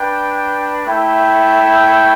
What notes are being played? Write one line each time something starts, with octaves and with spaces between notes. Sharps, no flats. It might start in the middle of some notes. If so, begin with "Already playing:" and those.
Already playing: D4 B4 G5
A3 E4 A4 G5